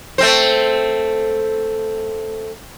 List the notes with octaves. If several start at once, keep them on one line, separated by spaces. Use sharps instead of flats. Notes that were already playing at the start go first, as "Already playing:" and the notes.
A3 C4 C5